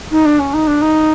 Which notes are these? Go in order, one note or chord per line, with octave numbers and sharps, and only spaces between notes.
D#4
D4
C#4
D#4
D4
D#4